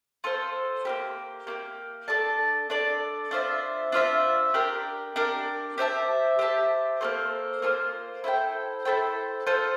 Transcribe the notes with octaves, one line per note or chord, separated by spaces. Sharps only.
F4 A4 C5
A#3 E4 G4
A#3 E4 G4
D4 A4 D5 A5
D4 A4 D5 A5
D4 F4 C5 E5
D4 F4 C5 E5
D4 G4 A#4
D4 G4 A#4
G4 C5 E5 A5
G4 C5 E5 A5
A#3 F4 A4 C5
A#3 F4 A4 C5
E4 A4 C5 G5
E4 A4 C5 G5
F4 A4 C5